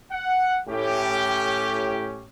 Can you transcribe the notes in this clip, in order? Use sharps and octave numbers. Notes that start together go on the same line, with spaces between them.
F#5
A2 C#4 G4